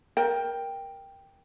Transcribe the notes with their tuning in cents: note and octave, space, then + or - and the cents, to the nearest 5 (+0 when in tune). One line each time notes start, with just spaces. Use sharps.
A#4 +15 G5 +5